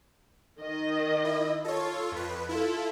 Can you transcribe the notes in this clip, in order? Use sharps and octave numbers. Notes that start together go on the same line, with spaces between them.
D#3 D#5
E4
F4 A4 C#5
F2 B4
E4 F4 A4